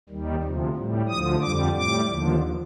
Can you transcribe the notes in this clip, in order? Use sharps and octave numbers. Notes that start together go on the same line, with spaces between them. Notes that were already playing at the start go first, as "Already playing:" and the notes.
D#2 D#3 G3
D2 C3 F3
A2 G3
D2 D3 F3 D#6
F2 D3 G3 D6
A2 G3 D6
D#2 D3 F3